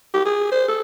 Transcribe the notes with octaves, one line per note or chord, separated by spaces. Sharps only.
G4
G#4
C5
A4